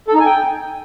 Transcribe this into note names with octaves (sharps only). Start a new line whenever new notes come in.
A4
D#4
G#5
G5